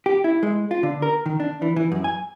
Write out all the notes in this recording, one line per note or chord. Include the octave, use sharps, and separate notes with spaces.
G4
E4
G#3
F4
D3
A#4
D#3
D4
E3
E3
F#2
G#5